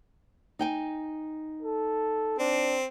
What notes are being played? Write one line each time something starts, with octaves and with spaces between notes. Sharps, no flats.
D#4 G5 G#5
A4
C4 D4